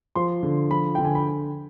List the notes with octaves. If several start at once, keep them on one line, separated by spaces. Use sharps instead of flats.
F3 C6
D3
F3 B5
D3 G5
G#5
B5